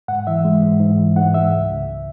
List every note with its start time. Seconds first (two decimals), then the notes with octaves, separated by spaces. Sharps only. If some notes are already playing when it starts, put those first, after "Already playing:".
0.08 G#2 F#5
0.27 E3 E5
0.45 G#3
0.63 G#2
0.80 G#2
0.99 E3
1.16 G#2 F#5
1.34 G#2 E5
1.53 C#2
1.70 C#2